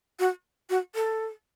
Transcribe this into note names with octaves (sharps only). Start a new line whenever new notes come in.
F#4
F#4
A4